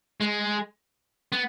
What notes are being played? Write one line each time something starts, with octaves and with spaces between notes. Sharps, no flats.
G#3
B3